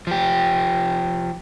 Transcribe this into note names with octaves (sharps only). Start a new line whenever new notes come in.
F3 G4